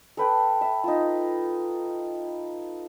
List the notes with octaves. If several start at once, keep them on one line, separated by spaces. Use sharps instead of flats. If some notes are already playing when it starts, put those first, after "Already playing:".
A4 B4 G5
E5
D#4 F4